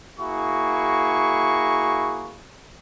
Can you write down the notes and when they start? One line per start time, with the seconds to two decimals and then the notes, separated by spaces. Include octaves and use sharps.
0.19 A#3 E4 F#4 G#4 C#6